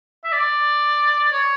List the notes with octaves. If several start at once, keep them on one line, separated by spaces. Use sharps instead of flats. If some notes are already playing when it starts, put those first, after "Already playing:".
E5
D5
C#5